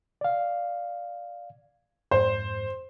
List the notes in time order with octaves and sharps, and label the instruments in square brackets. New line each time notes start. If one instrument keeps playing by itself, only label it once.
[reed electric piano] D5 F5
[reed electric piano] F2 G#2 [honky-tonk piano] C5